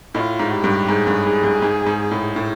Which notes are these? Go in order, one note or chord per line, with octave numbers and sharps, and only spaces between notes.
A2 F4
G#2
G4
G2
G#2 G#4
G2
G#2
G2
G#2
G#2
A2
A2